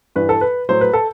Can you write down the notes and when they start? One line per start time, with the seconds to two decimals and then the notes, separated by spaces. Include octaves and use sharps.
0.16 G2 E3 B4
0.29 A4
0.41 B4
0.69 A2 F#3 C5
0.81 B4
0.93 A4